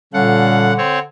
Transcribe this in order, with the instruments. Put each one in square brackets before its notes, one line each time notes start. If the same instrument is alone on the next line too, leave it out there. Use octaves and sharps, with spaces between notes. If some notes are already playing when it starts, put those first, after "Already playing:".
[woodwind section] A#2 G3 [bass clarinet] D3 [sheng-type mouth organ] C#4 A4 F5 [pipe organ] F#5
[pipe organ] C4 C#5